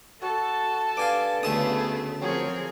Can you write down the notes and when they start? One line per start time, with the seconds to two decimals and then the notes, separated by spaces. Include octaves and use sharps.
0.22 F#4 A4 A5
0.97 G2 F5 G#5 D6
1.43 D2 C#3 A3 B3 C#4 G#4 A5 D#6
2.22 F3 F#3 C4 G#4 A#4 C#5